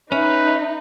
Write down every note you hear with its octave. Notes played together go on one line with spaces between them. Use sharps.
C#4 D#4 B4 E5